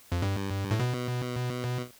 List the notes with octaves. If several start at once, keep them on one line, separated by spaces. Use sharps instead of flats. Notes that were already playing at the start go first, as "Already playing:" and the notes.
F2
G2
A2
B2